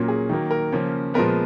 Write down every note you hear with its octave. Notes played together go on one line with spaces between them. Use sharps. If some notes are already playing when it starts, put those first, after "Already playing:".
Already playing: A#2 F#3 A#3 C#4
G#4
D#3 F#3 A#3
A#4
C#3 F3 A#3 C#4
A#2 F3 G#3 B3 A#4